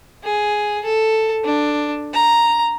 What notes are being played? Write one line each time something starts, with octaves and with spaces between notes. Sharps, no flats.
G#4
A4
D4
A#5